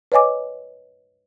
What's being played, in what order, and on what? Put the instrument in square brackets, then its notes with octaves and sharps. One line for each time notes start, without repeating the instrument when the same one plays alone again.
[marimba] B4 C#5 D#5 G#5 D6